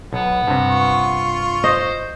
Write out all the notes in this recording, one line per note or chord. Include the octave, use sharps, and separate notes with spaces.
B1 B3
G2 C3
F4 C#6
C5 D#5